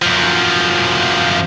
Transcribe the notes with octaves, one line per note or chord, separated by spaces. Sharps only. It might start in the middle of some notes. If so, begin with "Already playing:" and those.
F#2 F3